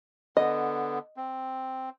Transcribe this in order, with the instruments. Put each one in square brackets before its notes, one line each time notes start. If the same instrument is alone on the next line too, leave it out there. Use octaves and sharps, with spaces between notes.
[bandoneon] D3 B3 [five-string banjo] D#5
[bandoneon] C4